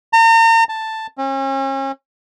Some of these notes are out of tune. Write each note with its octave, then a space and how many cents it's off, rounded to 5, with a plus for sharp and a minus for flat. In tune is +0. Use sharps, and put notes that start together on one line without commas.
A#5 -40
A5 +5
C#4 -40